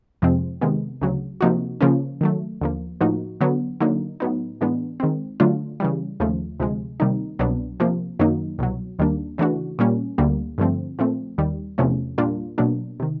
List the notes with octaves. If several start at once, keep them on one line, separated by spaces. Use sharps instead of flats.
F2 C3 F3 G#3 C4
C3 D#3 G#3 B3
D2 C#3 F#3
C3 F3 A#3 D#4 F#4
C#3 F3 A#3 C#4
D#3 F#3 A3
D#2 D3 F3 A#3
A2 F3 A#3 D#4 F#4
D3 F#3 B3
D3 F#3 A#3 D#4
A2 F#3 B3 D#4
A2 E3 G#3 B3 D4
D#3 G#3 C4
D3 F#3 A3 D4 F4
C#3 E3 G3
D#2 C#3 F3 A3
D2 C3 F3 G#3
C3 D#3 G3 A#3 D#4
C2 B2 F#3 B3 D4
C3 F3 A#3
F#2 D#3 F#3 A#3 D#4
C2 B2 F#3
D#2 D#3 G3 A#3 D4
C#3 E3 A3 D4 F#4
A#2 G3 A#3 C#4
D2 D3 G3 A#3
G2 D3 F3 A3 C4
A#2 F3 A3 C4
D#2 D#3 G3
E2 C3 F3 A3 C#4
A#2 G3 A#3 D4 F4
B2 F#3 A#3 D4
C3 D#3